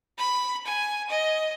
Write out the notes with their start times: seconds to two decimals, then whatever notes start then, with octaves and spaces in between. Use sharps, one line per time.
0.18 B5
0.66 G#5
1.10 D#5